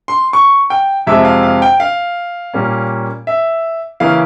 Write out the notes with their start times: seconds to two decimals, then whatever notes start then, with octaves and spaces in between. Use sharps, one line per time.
0.08 C6
0.33 C#6
0.70 G5
1.07 F2 C3 F3 G#3 E5
1.25 F5
1.43 F5
1.62 G5
1.80 F5
2.54 A#2 G3 A#3 C#4
3.27 E5
4.00 C#3 E3 A#3 C#4 F5